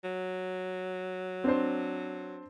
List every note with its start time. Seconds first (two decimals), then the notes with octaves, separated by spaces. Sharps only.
0.04 F#3
1.44 C4 D4 C5